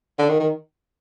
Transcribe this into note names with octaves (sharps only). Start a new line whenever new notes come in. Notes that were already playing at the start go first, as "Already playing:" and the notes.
D3
D#3
D#3